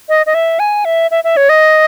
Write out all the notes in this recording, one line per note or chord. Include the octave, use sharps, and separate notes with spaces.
D#5
D#5
E5
G#5
E5
E5
E5
C#5
D#5